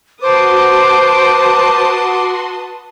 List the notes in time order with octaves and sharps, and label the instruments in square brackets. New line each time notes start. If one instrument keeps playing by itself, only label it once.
[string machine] F#4 C6 [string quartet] B4 A5 D#6 [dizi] C5 [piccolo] D6